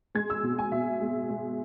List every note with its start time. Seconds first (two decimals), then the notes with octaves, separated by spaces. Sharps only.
0.15 G#3 G#6
0.30 E6
0.43 B2
0.59 G#5
0.72 B2 E5
1.00 G#3
1.29 G#3